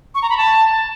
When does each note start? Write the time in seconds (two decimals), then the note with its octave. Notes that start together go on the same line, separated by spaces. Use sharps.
0.15 C#6
0.22 A#5
0.30 B5
0.37 A5